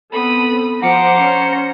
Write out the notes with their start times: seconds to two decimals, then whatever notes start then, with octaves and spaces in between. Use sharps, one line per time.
0.12 B3 C4 A4 B5 D#6
0.82 F3 C5 F#5 A#5 D6 C#7
1.17 C#4 C#7